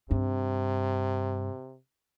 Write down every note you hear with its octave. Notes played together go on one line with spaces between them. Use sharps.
G2 C3 C4